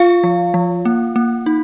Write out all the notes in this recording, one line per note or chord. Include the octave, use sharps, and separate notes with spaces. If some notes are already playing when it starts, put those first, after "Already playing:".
Already playing: F4 F5
F3
F3
A#3
A#3
D#4